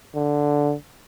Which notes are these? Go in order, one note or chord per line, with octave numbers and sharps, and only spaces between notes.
D3